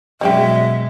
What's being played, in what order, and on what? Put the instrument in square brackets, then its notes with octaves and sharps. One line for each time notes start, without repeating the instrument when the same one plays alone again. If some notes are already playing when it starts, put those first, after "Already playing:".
[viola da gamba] F#2 B2 G#3 [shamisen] G3 C#4 G5 [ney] E5